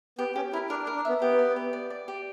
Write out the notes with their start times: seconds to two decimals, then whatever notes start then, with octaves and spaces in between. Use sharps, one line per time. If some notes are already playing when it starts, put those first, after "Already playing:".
0.19 B3 G4
0.36 C#4 G4
0.53 E4 A#4
0.70 D4 A#4
0.83 D4
0.87 A#4
0.96 D4
1.05 B3 E5
1.22 B3 G4
1.39 D5
1.56 G4
1.73 D5
1.90 D5
2.08 G4